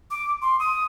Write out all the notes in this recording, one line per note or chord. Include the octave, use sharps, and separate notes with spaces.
D6
C6
D#6